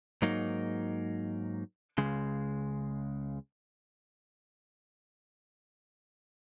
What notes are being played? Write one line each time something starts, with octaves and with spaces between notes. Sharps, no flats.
G#2 F#3 A#3 D#4
C#2 C#3 G#3